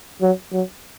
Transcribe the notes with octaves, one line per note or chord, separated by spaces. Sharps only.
F#3
F#3